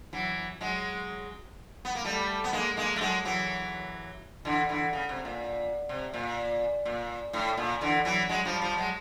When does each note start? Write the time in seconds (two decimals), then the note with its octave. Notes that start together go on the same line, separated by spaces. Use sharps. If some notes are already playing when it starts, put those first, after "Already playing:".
0.13 E3 F#3
0.61 F#3 G#3
1.85 B3
1.95 A#3
2.05 G3 A3
2.44 B3
2.53 G#3 A#3
2.77 G#3 A#3
2.96 A3
3.01 F#3 G#3
3.25 E3 F#3
4.45 D3 E3
4.69 D3 E3
4.93 C#3
5.09 C3
5.25 A#2
5.89 C3
6.13 A#2
6.85 A#2
7.33 A2
7.57 A#2
7.81 D3 E3
8.05 E3 F#3
8.29 F#3 G#3
8.45 F3 G3
8.62 F3 G3
8.77 F#3 G#3